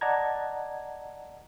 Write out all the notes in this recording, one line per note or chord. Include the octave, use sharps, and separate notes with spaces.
D5 D#5 F#5 A5 A#5 G#6